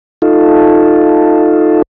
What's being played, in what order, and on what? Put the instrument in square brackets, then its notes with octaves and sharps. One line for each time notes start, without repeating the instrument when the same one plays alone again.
[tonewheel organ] D#4 F4 A4